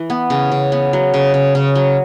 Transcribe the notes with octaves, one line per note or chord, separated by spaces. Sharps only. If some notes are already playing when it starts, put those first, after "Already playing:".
Already playing: E3
B3
C#3 C#4
C#3
B3
F#3
C#3
C#3
C#3
F#3